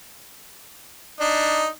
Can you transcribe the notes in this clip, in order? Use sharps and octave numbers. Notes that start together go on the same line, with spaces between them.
D4 D#4